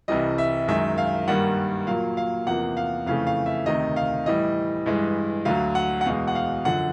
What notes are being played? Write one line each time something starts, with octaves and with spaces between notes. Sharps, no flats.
C2 C3 E3 G3 D#5
E5
F#2 D#3 G#3 E5
F5
G2 D#3 G3 A#3 F#5
A#2 F#3 A#3 F5
F5
E2 C3 F3 A#3 F#5
F5
F2 C#3 E3 A3 F5
F5
E5
D2 C3 D#3 D#5
F5
A2 E3 G3 D#5
G2 E3 G#3
D2 D3 F#3 F5
F#5
F#5
E2 B2 G#3 F5
F#5
F5
F#2 D3 F3 F#5